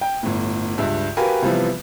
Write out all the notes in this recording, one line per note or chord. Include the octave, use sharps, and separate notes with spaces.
G5
G1 A2
C#2 G2 E5
F#4 G4 A#4 B4 F5 G#5
C3 E3 F3 G3 B3